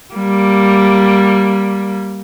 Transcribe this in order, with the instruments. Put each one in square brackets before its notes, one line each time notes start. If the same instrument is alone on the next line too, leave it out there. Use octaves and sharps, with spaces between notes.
[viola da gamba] G3 A#3